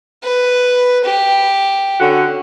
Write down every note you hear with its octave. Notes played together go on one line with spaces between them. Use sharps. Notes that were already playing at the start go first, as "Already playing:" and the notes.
B4
G4
D3 C#4 F#4